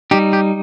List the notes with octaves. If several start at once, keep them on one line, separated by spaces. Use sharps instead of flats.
G3 D#4 G4
G4